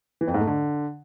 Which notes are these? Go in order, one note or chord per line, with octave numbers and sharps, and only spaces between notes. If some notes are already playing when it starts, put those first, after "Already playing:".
E3
F2
G#2
A3
D3